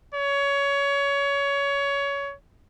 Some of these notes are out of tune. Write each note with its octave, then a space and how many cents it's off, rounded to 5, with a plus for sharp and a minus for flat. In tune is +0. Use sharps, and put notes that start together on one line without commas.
C#5 +20